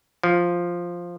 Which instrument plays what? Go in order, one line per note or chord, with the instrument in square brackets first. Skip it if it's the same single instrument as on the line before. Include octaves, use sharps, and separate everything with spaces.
[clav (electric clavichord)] F3